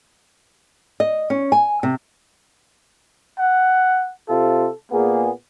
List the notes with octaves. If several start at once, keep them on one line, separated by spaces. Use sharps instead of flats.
D#5
C#4
G#5
C3
F#5
C3 F4 A4
A#2 A#3 B3 G#4